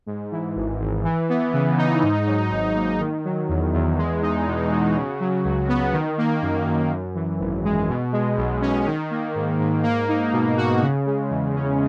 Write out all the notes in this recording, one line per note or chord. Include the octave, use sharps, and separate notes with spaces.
G#2
E3
G#1
G#1
E3
B3
C#3
D#4
G#2
F#3
G#1
A#3
D#3
F#3
E2
E2
G#3
D#4
B2
F#4
C#3
F#3
C#2
B3
D#3
A#3
F#2
F#2
F#2
E3
G#1
G#3
B2
G#3
B1
C#4
D#3
A#3
G#2
G#2
A#3
D#4
B2
F#4
C#3
G#3
E2
C#4